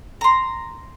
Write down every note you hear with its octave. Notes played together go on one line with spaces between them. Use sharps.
A#5 C6